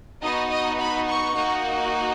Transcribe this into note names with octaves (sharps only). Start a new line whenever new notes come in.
B3 D#4 F#4 D#5
D#5
B5
C#6
A#3 D#4 F#4